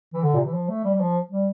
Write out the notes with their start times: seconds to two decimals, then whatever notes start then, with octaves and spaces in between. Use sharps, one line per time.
0.14 E3
0.23 D3
0.34 A#2
0.37 C3
0.45 E3
0.53 F3
0.69 A3
0.84 G3
0.94 G3
1.00 F3
1.31 G3